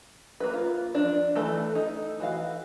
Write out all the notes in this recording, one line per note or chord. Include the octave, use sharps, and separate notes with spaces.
A#3 B4
F4
F3 D4
E3 A3 A4
D#4 A4
E3 F#4 F5